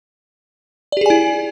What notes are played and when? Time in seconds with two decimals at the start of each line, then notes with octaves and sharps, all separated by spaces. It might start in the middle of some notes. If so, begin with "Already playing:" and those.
0.92 D5
0.97 G4
1.01 G#4
1.06 G#5
1.10 E4